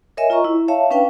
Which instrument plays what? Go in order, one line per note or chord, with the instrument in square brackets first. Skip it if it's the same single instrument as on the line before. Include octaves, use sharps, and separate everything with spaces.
[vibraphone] A#4 C#5 D#5 E5 G#5
F4 D#5 A#5 C#6
E4
C#5 E5 F5 A5
C#4 D4 B4 F5 G5